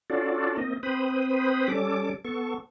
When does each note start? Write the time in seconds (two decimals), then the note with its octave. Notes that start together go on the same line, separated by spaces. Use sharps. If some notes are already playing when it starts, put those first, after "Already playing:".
0.10 C#4 D4 F4 F#4 A4 D5
0.58 A#3 C4 D#5
0.83 C4 B4 C5 B5 D#6
1.68 G3 C#4 A4 D6
2.25 B3 A4 C#6